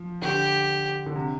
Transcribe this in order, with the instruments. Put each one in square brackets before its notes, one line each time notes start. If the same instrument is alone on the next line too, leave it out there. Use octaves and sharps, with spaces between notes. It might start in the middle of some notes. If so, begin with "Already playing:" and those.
Already playing: [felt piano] F3
[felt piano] D3 [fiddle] G4
[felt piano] D3
C3